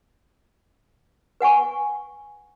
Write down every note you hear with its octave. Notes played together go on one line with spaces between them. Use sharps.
B4 F#5 G#5 C#6